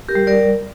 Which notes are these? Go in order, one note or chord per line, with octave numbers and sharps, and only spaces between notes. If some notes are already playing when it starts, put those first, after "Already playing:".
G4 A#4
G3
A#4 D5